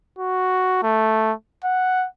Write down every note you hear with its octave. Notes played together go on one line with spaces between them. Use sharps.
F#4
A3
F#5